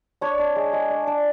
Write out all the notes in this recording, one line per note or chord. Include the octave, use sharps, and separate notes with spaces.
D4 C#5
D4
G#3
G#3
D4
D4